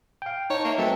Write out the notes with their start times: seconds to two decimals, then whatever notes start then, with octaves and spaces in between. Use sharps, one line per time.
0.22 F5 G5
0.50 D#4 C#5 A5 A#5
0.65 A#3 C#5 D#5 E5
0.78 F#3 A3 C4 A4 B4 G5 G#5